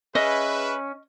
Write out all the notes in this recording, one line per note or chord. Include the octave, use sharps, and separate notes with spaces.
C#4 G#4 B4 D#5 E5